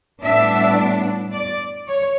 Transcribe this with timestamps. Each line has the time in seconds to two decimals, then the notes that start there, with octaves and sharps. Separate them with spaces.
0.23 A2 G3 B3 D4 E5
1.33 D5
1.88 C#5